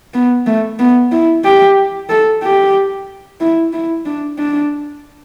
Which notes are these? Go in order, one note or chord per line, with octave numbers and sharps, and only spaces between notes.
B3
A3
B3
E4
G4
A4
G4
E4
E4
D4
D4